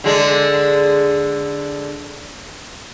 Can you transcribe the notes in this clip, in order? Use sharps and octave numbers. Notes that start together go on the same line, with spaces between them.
D3 G#3 D4